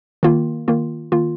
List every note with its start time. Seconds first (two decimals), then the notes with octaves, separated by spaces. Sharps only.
0.23 D#3 A#3 F4
0.68 D#3 A#3 F4
1.12 D#3 A#3 F4